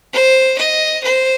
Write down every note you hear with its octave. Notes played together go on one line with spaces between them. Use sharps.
C5
D#5
C5